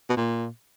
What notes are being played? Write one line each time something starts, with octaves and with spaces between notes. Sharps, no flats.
B2
A#2